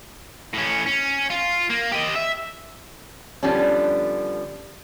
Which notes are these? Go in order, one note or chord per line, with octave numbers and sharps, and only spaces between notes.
A2 C#4
C#4
F4
A#3
G4 D#5
E5
D3 F3 G3 B3 C#4